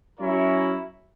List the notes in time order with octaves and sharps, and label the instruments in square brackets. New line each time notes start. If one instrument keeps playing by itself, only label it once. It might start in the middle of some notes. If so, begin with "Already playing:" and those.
[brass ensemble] F#3 C#4 E4 A#4 C#5